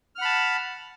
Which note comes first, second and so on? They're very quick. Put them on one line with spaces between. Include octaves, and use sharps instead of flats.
F6 F#5 B5 A5